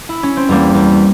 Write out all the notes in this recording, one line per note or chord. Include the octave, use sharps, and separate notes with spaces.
E4
C#4
C4
E2 G3 A#3
E2